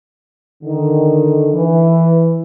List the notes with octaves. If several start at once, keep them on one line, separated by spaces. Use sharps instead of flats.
D3 D#3
E3